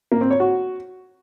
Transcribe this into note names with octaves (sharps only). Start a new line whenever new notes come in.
A#3
C4
C#5
F#4